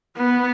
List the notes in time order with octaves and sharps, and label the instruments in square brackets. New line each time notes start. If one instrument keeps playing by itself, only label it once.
[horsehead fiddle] B3